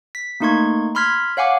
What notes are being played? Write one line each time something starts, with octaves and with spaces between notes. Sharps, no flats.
B6
A3 A#3 D#4 C6 C#6 G#6
B5 C6 F6 G#6 B6
C#5 F5 F#5 G#5 D6